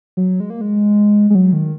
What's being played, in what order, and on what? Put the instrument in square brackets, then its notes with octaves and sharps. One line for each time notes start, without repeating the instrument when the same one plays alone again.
[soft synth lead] F#3
G#3
A#3
G#3
G#3
F#3
D#3